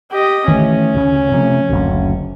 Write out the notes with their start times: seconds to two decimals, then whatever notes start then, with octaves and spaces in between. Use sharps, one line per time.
0.11 G4 D#5
0.48 D#3 E3 A3 C#4
0.94 D2 C#3
1.32 C3 F3 A3
1.69 F#1 D2